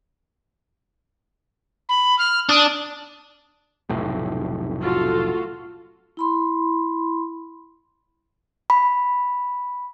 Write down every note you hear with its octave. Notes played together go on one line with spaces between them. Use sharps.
B5
F6
D4 D#6
F1 B1 A2
F4 F#4 A4
E4 B5 C6
B5